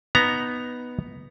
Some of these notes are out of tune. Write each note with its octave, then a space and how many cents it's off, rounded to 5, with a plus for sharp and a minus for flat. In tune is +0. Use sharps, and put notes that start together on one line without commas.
B3 +0 D#4 +0 A#5 +0